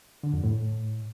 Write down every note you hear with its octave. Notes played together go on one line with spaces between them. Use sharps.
D3
F2
A2